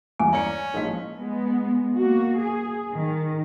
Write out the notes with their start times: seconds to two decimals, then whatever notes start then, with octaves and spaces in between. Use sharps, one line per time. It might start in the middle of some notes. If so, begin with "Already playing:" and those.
0.19 E2 G2 G#5 D6
0.33 C#4 D5 A#5 C#7
0.74 A#1 F3 G#3 D#4 B6
1.18 G#3 B3
1.99 A#3 F#4
2.41 G#4
2.95 D#3